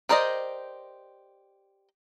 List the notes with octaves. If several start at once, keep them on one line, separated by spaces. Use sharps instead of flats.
G4 A#4 C5 D5 D#5